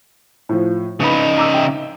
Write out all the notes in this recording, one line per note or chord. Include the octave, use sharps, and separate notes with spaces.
A2 F3
C#3 D#4 B4 D#5 B5
A#5 D6 E6
E5 G5